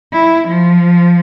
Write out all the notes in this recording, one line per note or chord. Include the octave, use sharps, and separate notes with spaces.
E4
F3